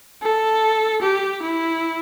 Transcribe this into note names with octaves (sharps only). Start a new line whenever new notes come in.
A4
G4
E4